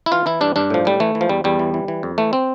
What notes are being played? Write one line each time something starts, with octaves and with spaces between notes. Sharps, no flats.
E4
E3 F4
E3 E4
G2 D4
G2 D4
A2 F3
A2 G3
E3 A3
E3
F3
E2 G3
E2 G3
E3
E3
E3
F2
E3 A3
C4